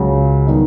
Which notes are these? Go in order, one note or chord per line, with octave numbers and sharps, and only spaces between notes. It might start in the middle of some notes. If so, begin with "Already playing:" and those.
Already playing: C#2 C#3 F#3
D#3 G3 B3 D#4